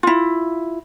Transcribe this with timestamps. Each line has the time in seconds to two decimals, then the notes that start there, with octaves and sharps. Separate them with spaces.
0.03 E4 F4